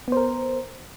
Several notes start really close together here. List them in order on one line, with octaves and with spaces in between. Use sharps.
B3 C5 A#4